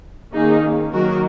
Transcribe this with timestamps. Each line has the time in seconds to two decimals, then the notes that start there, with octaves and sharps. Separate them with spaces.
0.34 D#3 A#3 C#4 D#4 G#4
0.93 D#3 F#3 A#3 F#4 A#4